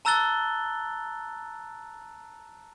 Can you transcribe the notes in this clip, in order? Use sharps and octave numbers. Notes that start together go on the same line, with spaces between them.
A5 A#5 E6 F#6 A6 G7